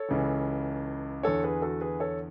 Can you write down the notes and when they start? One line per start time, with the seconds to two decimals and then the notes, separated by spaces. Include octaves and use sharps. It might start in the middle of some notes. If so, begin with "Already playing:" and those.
Already playing: A4 C#5
0.09 C#2 C#3 E3
1.23 E2 D3 A4 C#5
1.44 G#4 B4
1.62 F#4 A4
1.81 G#4 B4
2.00 A4 C#5